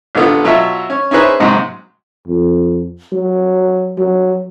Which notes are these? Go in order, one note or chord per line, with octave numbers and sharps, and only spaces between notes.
A1 D3 B3 F4
B2 F#3 E4 F4 E5
C#4
C#4 D#4 E4 G#4 B4 C5
A#1 G#2 C3 F#3
F2
F#3
F#3